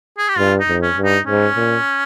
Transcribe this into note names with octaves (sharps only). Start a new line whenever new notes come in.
G#4
G4
G2 F4
D#4
F2
C#4
G2
D#4
G#2 C#4
A#2